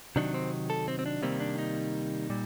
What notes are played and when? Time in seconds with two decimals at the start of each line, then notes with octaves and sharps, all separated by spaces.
0.16 C3 D#3 F#3 D4
0.34 C4
0.70 A4
0.88 C4
0.99 C4
1.06 D4
1.22 C3 D#3 G3 A#3 C4
1.40 D4
1.59 D#4
2.30 A#2 G3